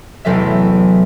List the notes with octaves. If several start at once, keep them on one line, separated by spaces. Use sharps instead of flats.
A1 E2 C3 F#3 A4 E5